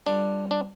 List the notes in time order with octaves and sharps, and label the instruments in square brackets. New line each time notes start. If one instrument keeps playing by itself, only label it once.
[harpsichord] G2 D3 G3 F4 [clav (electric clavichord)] D4
[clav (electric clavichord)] D4